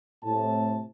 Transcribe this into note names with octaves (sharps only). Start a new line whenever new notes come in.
A2 C3 A5